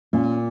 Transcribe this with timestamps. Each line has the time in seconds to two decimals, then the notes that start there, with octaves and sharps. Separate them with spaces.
0.13 A#2 C#4